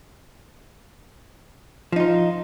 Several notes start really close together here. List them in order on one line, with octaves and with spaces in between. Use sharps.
F3 D#4 F4